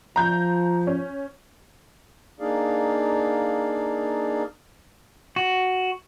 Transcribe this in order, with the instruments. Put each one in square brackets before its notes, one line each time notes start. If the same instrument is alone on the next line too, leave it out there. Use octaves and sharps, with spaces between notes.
[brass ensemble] F3 [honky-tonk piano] A#5 G6
[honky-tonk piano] C#4
[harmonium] A#3 D4 D#4 G#4 D5 F5
[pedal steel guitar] F#4